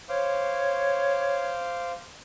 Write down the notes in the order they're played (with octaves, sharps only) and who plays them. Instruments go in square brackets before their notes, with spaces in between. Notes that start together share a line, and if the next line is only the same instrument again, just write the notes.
[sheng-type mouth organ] C5 F5 D6 [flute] C#5